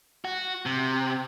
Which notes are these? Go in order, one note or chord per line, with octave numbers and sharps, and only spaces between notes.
F#4
C3